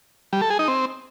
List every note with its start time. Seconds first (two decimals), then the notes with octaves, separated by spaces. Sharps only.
0.33 G3
0.41 A4
0.50 G#4
0.59 D#4
0.68 C4